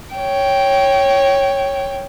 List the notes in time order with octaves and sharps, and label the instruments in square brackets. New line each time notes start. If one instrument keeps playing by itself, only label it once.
[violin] C#5 G5